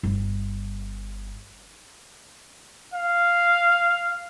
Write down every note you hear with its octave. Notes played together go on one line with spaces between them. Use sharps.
G1
F5